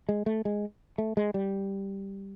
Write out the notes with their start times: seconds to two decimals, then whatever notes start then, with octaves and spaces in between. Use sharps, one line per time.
0.09 G#3
0.26 A3
0.45 G#3
0.98 A3
1.17 G#3
1.34 G3